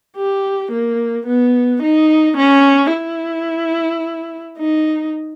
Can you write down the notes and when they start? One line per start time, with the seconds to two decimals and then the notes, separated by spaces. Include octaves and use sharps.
0.17 G4
0.72 A#3
1.27 B3
1.82 D#4
2.37 C#4
2.93 E4
4.58 D#4